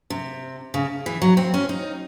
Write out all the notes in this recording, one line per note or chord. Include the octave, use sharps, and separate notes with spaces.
C3
C#3
E3
F#3
C4
C#4
D#4